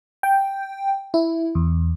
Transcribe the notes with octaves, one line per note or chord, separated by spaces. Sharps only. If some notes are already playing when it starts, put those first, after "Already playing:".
G5
E4
E2